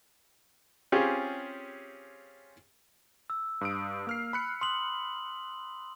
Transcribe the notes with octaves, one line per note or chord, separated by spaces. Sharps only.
C4 C#4 F4 G4 G#4
E6
G2 D#6 D7
A#3 F6 C7
B5 F#6 C#7
C6 D#6 F#7